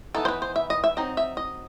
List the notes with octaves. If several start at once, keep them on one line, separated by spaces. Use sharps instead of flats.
E3 B3 D#4 A4
C5
B4
C5
E5
D#5
E5
F#3 C4 D#4 D#5
E5
D#5